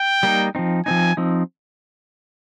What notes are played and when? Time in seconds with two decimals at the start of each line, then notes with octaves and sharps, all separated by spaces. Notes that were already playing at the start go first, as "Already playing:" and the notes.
Already playing: G5
0.23 G3 A#3 D#4
0.55 F3 C4 D#4
0.86 F3 C4 D#4 G#5
1.17 F3 C4 D#4